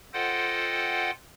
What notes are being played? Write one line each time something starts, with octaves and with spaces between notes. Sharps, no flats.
F4 A4 C5 D#5 F#5 G5